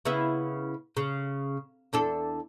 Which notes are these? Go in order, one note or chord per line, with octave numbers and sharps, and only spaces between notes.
C#3 B3 E4
C#3
E2 D4 A4